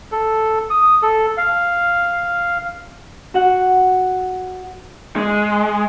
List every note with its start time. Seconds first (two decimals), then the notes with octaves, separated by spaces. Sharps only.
0.12 A4
0.70 D#6
1.03 A4
1.38 F5
3.34 F#4 F#5
5.16 G#3